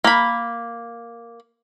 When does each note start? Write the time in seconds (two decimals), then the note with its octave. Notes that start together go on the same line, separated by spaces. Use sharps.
0.04 A#3 B5